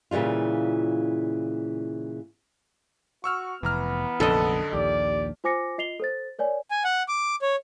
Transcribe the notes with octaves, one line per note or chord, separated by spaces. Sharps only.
A#2 C#3 E3 G3 F4
F#4 C#6 E6 F6
F1 E3 B3 A#5 F6
F1 A#1 F#2 D3 A4 D#5
A#1 D#2 G4 D5
F4 C5 G#5 D6 A#6 C#7
F4 D#5 C7 F7 G7
A4 C5 A6
A#4 C#5 D5 G#5
G#5
F#5
D6
C#5